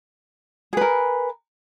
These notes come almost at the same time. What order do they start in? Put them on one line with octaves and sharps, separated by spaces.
G#4 B4 A#4